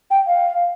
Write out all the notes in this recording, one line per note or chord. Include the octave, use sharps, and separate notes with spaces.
G5
F5